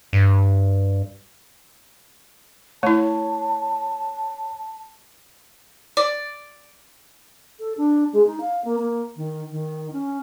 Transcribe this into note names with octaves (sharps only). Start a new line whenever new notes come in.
G2
A3 E4 C#5 A5
D5
A4
D4
G#3
D#4
F5
A#3
A#3
D#3
D#3
C#4